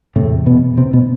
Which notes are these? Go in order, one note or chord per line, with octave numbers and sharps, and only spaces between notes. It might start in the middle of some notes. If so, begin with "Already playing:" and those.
E2 A2 C3 A3
B2 B3
C3 C4
B2 B3